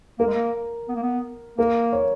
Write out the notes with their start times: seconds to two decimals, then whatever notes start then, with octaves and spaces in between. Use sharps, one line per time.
0.19 A#3 A#4
0.27 G#3
0.34 A#3
0.89 B3
0.95 A#3
1.03 B3
1.58 A#3 A#4
1.93 C#5